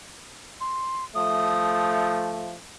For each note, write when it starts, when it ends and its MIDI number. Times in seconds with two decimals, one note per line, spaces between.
0.61 1.04 84
1.15 2.53 53
1.15 2.53 57
1.15 2.16 87